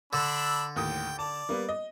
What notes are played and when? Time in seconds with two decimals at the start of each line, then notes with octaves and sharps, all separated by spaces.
0.13 D3 D4 B5 E6
0.76 D#2 A2 G5 D#6
1.19 D5 A5
1.49 G3 A#3 B3
1.69 D#5